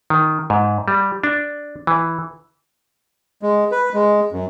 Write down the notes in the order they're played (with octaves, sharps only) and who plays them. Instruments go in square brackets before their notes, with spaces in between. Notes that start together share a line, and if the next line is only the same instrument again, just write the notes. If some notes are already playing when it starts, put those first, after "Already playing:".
[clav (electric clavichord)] D#3
G#2
G3
D4
E3
[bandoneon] G#3
B4
G#3
F#2